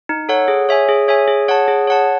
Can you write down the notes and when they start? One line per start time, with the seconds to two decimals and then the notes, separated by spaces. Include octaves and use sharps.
0.09 D#4
0.29 A4 C#5 F#5
0.48 G#4
0.69 C#5 E5 G#5
0.89 G#4
1.08 C#5 E5 G#5
1.28 G#4
1.48 C#5 F#5 A5
1.68 G#4
1.87 C#5 F#5 A5